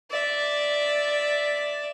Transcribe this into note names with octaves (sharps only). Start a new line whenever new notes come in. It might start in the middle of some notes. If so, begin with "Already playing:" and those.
D5 E5